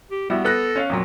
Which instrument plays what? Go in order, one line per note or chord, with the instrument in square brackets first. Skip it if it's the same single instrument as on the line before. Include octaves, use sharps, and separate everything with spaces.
[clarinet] G4
[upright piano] G3 E4 F#4 [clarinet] B3
[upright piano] B3 F#6 A#6 [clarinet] A4
[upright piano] C#4 C#5 F5
F2 A#2 F#3